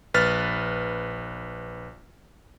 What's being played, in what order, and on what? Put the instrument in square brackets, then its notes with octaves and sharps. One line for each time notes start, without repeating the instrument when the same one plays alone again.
[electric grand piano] A#1 B4 F6 A6